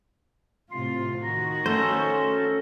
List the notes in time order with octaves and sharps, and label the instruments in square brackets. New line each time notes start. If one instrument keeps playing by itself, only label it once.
[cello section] A2 C3 F4 [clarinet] C6
[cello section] D#3 F#4 [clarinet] A#5
[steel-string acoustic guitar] A3 [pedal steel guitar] C#4 A4 C5